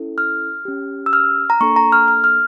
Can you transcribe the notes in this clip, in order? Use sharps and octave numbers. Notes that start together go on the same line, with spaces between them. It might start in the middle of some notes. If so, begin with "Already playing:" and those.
Already playing: C#4 E4 A4
F6
C#4 G4
E6
F6
A#5
A#3 D4 A4 C#6
A#5
F6
F6
F6